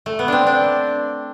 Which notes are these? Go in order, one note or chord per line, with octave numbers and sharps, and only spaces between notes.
A3
B3
C4 D4
D4